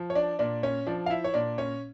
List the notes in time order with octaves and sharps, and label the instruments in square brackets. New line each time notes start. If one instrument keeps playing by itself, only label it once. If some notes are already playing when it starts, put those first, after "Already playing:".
Already playing: [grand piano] F3
C#5
D4 D5
A#2 D4 D5
C#4 C#5
F3 D4 D5
F5
E4 E5
C#5
A#2 D4 D5
C#4 C#5